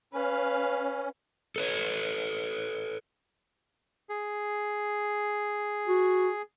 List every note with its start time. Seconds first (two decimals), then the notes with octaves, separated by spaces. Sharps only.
0.13 C#4 B4 F5
1.56 A4 B4 C#5
4.09 G#4
5.88 F#4